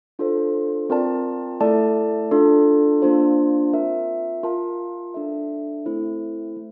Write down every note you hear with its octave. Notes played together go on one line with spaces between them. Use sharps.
D4 F4 A4 C5
C4 F4 A#4 D5 A5
A3 E4 A4 D5 A5
D4 F4 A4
A#3 D4 F4 C5
C4 F4 A#4 E5
F4 A#4 F5 A5
D4 A4 E5
A3 C4 E4 A4 C5
A3